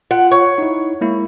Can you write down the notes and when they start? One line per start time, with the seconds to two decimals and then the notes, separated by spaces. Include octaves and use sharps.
0.11 F4 F#5
0.31 C#5
0.58 D#4 E4
1.01 G#3 A#3 E4